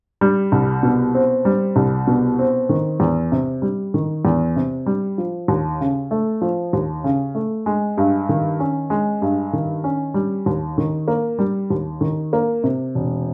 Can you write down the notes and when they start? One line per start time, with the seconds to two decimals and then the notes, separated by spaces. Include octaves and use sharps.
0.21 G3
0.52 C2
0.83 B2
1.14 C4
1.45 G3
1.76 C2
2.07 B2
2.39 C4
2.69 D#3
3.00 E2
3.32 C3
3.62 G3
3.94 D#3
4.25 E2
4.56 C3
4.86 G3
5.18 F3
5.48 D#2
5.81 C#3
6.11 A3
6.42 F3
6.73 D#2
7.04 C#3
7.35 A3
7.66 G#3
7.98 G2
8.29 D#3
8.60 C#4
8.90 G#3
9.22 G2
9.53 D#3
9.84 C#4
10.14 G3
10.46 D#2
10.78 D#3
11.08 A#3
11.39 G3
11.70 D#2
12.01 D#3
12.33 A#3
12.64 C3
12.95 E1